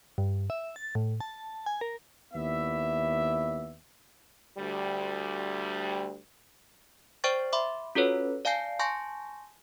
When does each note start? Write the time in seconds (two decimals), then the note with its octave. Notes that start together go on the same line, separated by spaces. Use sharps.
0.18 G2
0.50 E5
0.76 A6
0.95 A2
1.20 A5
1.66 G#5
1.81 A#4
2.34 D#2 B3 E4 D5 E5
4.57 D2 G3
7.24 C5 D5 G5 C#6 A6
7.53 E5 B5 C6 D6
7.95 C#4 F4 F#4 A4 B4 C#5
8.45 D5 F5 G#5 A5 G6 C7
8.79 G#5 A5 C6 C#6 G6 A#6